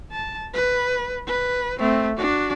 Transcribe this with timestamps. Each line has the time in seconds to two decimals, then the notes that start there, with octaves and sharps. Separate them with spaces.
0.12 A5
0.54 B4
1.27 B4
1.78 A3 C4
2.16 D4 F#4